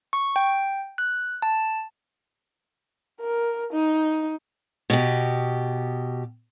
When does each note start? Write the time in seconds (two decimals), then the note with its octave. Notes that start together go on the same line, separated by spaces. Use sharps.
0.13 C#6
0.36 G5
0.98 F#6
1.42 A5
3.20 A#4
3.73 D#4
4.90 B2 G4